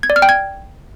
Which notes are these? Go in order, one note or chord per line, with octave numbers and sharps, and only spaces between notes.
G#6
D5
F6
G5
G#6